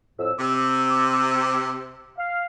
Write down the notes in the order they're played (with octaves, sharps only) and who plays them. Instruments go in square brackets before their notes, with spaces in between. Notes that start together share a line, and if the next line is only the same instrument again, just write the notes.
[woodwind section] F2 A2 E6
[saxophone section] C3 [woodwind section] D6 E6
[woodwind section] F5